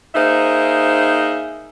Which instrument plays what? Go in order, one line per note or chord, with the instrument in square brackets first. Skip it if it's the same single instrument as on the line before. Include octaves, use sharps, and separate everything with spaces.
[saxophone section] A#3 D#4 G#4 C5 E5